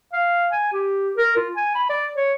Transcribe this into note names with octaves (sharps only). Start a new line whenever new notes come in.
F5
G#5
G4
A#4
F4
G#5
B5
D5
C#5